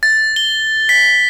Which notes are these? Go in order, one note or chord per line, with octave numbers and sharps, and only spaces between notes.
A6
G7
B6